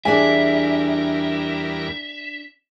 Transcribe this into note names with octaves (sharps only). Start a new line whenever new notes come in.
E2 G3 D4 G#4 A#4 E5 G#5